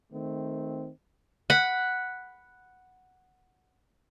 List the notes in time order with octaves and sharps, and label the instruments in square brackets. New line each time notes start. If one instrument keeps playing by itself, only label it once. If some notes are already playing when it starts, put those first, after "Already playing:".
[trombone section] D#3 A3 C4
[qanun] F#5 B5